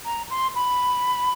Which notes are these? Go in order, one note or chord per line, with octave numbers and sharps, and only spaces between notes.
A#5
C6
B5